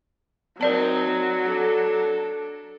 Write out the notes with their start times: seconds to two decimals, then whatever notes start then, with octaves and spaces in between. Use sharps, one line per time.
0.61 F#3 C4 D#4 A#4 D5 A5
1.45 D4 A4